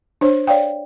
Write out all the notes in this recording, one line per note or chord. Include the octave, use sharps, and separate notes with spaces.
D4 C5 C#5
C#5 D5 F5 G5